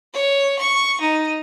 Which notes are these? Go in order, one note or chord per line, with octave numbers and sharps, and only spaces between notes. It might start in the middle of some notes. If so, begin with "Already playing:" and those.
C#5
C#6
D#4